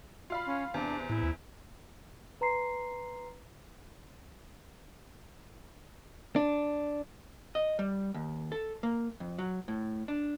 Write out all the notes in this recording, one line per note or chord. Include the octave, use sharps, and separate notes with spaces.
F4 F5 B5
C#4
E2 C3 D4
A2 E4
D#2
B4 A#5 C6 C7
D4
D#5
G3
D#2
A4
A#3
F2
F#3
A2
D4